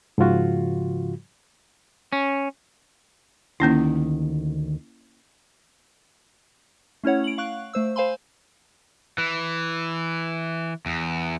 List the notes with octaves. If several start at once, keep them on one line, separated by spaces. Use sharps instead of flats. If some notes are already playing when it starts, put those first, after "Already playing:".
G#2 C#3 F3 F4 F#4
C#4
D2 D#3 A#3 C#4 E4
A3 C#4 E4 C#5 F#5
D7 F#7
F5 C#6 F#6
A3 C5 E6
C5 F5 G#5 B5 C6
E3
E2